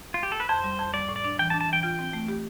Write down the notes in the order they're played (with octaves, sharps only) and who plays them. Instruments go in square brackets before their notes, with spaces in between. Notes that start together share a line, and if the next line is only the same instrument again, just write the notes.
[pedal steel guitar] F4
G4
A4
B4
[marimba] F2 [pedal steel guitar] C5
[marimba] G3
F2
[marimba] G3 [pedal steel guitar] D5
[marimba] A2
[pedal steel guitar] D5
[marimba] D4
[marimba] E3 [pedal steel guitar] G5
[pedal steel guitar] A5
[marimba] D4
[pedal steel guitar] A5
[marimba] E3 [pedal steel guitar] G5
[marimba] F4 [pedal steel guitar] G5
[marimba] C4
A3
G4